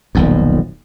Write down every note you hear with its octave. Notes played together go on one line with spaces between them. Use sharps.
D#1 B1 F2